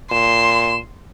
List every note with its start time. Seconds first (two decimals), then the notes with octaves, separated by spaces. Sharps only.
0.11 A#2 C6 E7